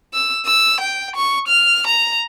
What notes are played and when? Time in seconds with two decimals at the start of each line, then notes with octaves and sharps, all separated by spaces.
0.14 E6
0.46 E6
0.80 G5
1.16 C#6
1.48 F6
1.87 A#5